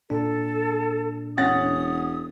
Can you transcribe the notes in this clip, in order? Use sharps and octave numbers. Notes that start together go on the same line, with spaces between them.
A#2 D4 A4
E1 C#4 F#5 D#6 A6